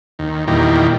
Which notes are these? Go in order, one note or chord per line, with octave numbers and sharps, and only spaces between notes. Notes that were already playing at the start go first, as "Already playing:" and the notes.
D#2
E2 A#2 D#3 G3